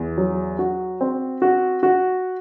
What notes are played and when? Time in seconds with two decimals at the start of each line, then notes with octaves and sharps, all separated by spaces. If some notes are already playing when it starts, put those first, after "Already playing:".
Already playing: E2
0.18 F#3
0.59 F#4
1.01 C4
1.42 F#4
1.83 F#4